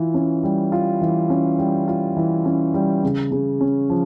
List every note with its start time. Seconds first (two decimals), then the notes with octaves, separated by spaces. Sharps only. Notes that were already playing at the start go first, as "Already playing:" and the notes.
Already playing: E3 F4
0.14 C#4
0.43 G3
0.72 F4
1.01 E3
1.30 C#4
1.59 G3
1.88 F4
2.17 E3
2.45 C#4
2.74 G3
3.03 C#3
3.32 C#3
3.61 C#4
3.90 F3